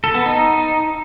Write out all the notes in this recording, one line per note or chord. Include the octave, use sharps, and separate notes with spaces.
A4
B3
D#4